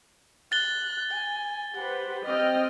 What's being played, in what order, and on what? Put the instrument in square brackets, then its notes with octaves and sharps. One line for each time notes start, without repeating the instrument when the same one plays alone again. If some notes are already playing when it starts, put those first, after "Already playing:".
[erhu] F#6 [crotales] A6 G7
[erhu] G#5
[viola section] G4 B4 C5 [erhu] F#5
[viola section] C4 D#5 G5 [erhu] F6